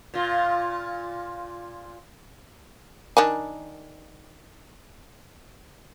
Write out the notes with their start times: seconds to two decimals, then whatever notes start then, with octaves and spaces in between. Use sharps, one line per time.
0.14 A#2 F4
3.17 D#3 D4 G#5